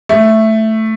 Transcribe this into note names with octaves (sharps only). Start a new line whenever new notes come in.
A3